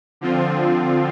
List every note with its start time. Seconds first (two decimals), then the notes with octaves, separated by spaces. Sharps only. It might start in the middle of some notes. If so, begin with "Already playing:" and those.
0.21 D3 F3 C4 F4